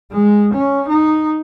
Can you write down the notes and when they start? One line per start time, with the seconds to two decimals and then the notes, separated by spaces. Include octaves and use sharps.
0.11 G#3
0.54 C#4
0.88 D#4